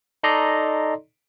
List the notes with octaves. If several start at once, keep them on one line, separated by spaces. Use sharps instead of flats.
D#4 A4 D5 D#5 A#5 C6